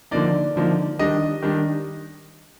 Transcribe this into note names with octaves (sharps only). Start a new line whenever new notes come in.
D3 F3 A#3 D#4 D5
D3 F3 A#3 D#4
D#3 G3 D4 D#5
D#3 G3 D4